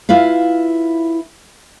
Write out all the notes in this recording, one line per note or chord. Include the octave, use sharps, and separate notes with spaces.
E4 F4 B4 F5